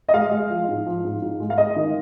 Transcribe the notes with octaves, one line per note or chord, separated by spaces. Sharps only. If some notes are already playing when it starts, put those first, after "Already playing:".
D#5
G#3 F5
G#3
F3
G#2
F3
G#2
G#2
G#3
F5
G#3 D#5
D#3